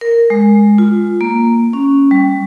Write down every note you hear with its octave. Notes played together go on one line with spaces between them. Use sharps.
A#4
G#3
F4
A#3
C#4
G3